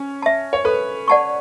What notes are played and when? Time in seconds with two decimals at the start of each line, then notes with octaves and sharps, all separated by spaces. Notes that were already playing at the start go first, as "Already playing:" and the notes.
Already playing: C#4
0.22 E5 A5
0.53 C#5
0.65 A4 B4
1.08 D5 F#5 A5 C#6